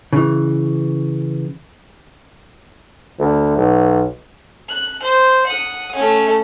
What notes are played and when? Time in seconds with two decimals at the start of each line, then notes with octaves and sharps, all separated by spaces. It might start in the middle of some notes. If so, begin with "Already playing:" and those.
0.13 C#3 E3
3.19 D2
3.57 B1
4.69 F#6
5.03 C5
5.46 F#5 D#6
5.95 A3 C#4